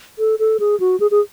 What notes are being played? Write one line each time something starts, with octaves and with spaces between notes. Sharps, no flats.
A4
A4
G#4
F#4
G#4
G#4